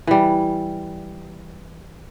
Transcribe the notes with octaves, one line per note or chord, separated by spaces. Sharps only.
E3 G3